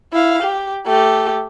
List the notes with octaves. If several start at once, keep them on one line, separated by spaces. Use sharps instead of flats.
E4 F5
G4
A3 G4